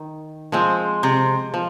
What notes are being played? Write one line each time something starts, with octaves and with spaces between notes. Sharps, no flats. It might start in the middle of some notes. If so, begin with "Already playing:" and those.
Already playing: D#3
F3 G#3 C4
C3
F3